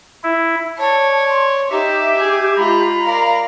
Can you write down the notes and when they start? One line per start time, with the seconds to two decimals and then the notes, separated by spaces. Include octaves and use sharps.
0.23 E4
0.78 C#5 D5 A5
1.28 C6
1.71 D#4 G4 E5 D6
2.17 G#4
2.57 G#3 F4 A#5 B5
3.06 A#4 D5 F5